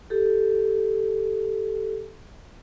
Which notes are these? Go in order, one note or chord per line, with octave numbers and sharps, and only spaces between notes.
G4 A4